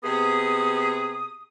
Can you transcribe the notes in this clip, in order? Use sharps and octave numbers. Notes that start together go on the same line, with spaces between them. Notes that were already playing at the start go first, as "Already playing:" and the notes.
C3 B3 G#4 D#6